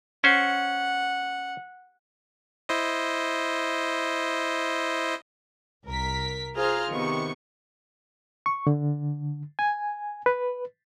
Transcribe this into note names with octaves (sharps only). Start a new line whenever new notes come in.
C#4 C5 F#5
E4 C5 D#5
C2 A#4 B6
F4 G#4 C5 A#5 F6
C3 D#3 B3 C#6 C#7
C#6
D3
G#5
B4